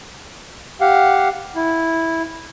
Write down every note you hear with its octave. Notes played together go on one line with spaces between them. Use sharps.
G4 F5 F#5
E4